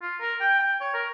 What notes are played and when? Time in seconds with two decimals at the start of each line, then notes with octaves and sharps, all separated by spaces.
0.02 F4
0.20 A#4
0.40 G5
0.60 G5
0.81 C#5
0.94 A#4